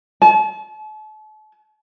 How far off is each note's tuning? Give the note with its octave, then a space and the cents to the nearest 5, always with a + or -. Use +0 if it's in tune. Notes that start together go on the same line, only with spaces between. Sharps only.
A5 -40